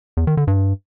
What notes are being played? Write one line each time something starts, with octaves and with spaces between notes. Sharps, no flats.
E2
D#3
D3
G2